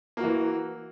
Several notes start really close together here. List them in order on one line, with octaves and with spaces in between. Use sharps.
A#3 F#4 E3